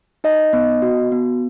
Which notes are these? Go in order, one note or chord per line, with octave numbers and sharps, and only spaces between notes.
D#4 D#5
B3
F#4
B3